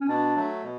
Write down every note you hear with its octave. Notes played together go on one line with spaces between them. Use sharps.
C#4
B2 D4
F#3 A3
B2